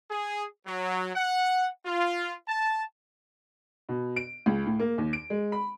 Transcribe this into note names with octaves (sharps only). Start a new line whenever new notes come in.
G#4
F#3
F#5
F4
A5
B2
D7
C#2
A2
A#3
D#2
D7
G#3
B5